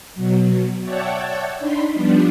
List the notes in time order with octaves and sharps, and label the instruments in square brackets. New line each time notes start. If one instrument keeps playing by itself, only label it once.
[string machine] B2 F#3
C#5 D5 E5 F#5 G5 A5
D4 D#4 B5 C6
F3 G3 B3 D4